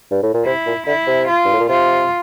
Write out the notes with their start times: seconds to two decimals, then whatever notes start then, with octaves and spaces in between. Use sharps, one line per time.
0.11 G2
0.23 A2
0.34 A#2
0.45 C3 E4
0.66 A#2
0.86 D3 E4
1.07 C3
1.27 F4
1.45 G2
1.53 A2
1.60 A#2
1.69 C3 F4